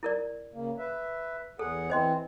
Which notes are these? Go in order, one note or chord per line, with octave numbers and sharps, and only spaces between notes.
E4 A#4 D5
C#3 A#3
B4 E5
E2 G#4 A4 F#5
E3 C4 C5 D#5 C6